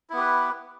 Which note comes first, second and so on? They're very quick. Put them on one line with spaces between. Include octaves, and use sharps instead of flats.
E4 B3 G4 B4